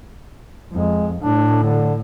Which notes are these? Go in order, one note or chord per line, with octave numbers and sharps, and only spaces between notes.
F2 G#3
A2 D4
D3